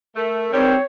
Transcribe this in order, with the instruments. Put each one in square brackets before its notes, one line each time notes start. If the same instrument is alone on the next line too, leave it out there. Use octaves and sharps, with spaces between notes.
[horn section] A3 [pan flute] A#4
[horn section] G#2 G3 [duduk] C4 [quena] C#5